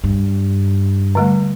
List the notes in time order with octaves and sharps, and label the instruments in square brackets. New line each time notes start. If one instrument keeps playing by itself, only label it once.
[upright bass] G2
[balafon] D3 G3 A3